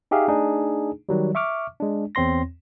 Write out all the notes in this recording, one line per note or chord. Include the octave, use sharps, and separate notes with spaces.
D#4 G4 G#4 E5 F5
A3 D4 D#4 G#4
D#3 F#3 G3
E5 C#6 D6 F6
G#3 D4
E2 C4 C#5 C6 A#6